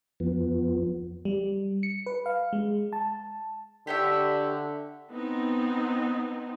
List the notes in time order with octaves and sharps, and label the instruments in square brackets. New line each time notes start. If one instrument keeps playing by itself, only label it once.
[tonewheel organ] F2 F3 B3
[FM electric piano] G3
C#7
B4
F5
G#3
A5
[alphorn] D3 [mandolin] G4 C#5 E5
[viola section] B3 C4 D#4